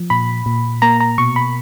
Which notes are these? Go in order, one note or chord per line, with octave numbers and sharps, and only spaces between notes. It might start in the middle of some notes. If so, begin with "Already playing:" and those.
Already playing: F3
A#2 B5
A#2
A#3 A#5
A#5
B2 C#6
B5